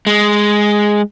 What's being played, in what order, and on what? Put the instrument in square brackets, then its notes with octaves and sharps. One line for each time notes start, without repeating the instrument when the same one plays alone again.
[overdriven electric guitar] G#3